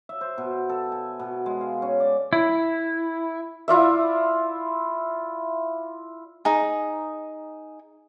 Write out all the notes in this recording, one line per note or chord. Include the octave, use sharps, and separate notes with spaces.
E5
C5
B2
A4
G#5
B2
G#3
F5
C#4
D5
E4
E4 F4 D5 E5
D#4 G#4